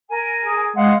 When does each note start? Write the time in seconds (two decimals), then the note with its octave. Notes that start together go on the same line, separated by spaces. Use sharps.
0.09 A#4 G#5
0.44 G#4
0.76 G#3 F5 F#5